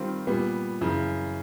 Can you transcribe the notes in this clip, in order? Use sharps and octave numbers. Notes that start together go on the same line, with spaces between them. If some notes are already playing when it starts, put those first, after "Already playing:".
Already playing: D#3 G3 C4 F4
A#2 G3 B3
F#2 C#3 E3